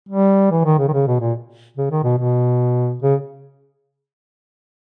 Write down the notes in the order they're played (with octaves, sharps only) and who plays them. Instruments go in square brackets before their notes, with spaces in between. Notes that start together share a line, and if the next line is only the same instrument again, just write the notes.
[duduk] G3
E3
D#3
C#3
D#3
C#3
B2
A#2
C#3
D#3
B2
B2
C#3